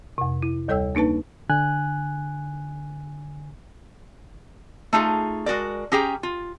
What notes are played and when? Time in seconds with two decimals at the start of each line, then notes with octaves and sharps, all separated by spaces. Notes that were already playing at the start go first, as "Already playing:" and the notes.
0.18 F2 C3
0.43 E4
0.68 D2 G3 A4 C#5 G5 E6
0.95 A#3 D4 D#4 B4 A5
1.49 D3 G#5 F#6
4.93 A3 D#4 F4 G#4
5.46 G#3 F#4 A#4 D5
5.92 C#4 G4 G#4 G5 A#5
6.23 F4